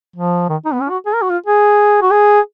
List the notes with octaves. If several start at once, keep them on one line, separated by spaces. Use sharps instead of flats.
F3
D#3
D#4
B3
C#4
F#4
G#4
A#4
F#4
F4
G#4
F#4
G#4